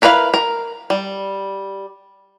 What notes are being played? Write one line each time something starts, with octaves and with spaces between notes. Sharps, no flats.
E4 A#4 B4 E5 F5
A#4
G3